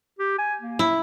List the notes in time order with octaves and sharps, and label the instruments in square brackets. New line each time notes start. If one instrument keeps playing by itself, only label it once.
[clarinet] G4
G#5
A#3
[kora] E4